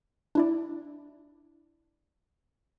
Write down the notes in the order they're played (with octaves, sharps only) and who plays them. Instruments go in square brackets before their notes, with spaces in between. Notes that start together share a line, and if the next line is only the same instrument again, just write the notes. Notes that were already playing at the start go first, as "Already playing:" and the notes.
[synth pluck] D4 E4 D5